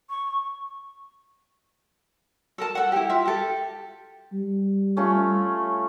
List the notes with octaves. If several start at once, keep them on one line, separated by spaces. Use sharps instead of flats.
C#6
A4 A#4 A5
A4 F#5
E4 G4
F4 E5
G4 A4
G3
A3 C#4 F4